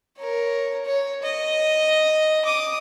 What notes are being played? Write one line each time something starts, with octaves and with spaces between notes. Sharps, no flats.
A#4 C#5
C#5
D#5
D6 D#6